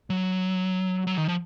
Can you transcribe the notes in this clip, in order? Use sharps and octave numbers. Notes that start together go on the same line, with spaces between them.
F#3
F#3
D#3
F3